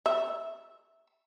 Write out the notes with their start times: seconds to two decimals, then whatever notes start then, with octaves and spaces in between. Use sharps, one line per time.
0.06 E5